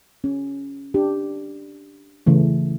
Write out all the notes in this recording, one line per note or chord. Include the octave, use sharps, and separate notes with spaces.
C#4
D4 G4
C#3 E3 A3